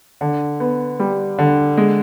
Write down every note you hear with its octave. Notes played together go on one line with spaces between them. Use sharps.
D3
B3
G3
D3
G#3